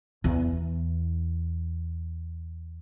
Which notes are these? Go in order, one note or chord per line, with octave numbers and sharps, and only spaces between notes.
E2 E4